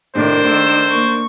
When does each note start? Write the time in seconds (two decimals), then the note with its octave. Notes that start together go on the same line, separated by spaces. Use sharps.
0.15 A2 C3 D#3 D4 A#4 C5
0.48 D#3 A3 E6
0.88 A#3 C#6